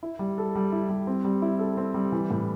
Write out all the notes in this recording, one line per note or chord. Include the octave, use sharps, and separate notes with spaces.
E4
G3
A4
G3
E4
G3
C4
G3
E4
A4
C4
G3
E3
A2